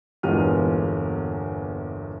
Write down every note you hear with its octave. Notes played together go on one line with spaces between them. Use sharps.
G1 E2 A#2 G#3 F6 D#7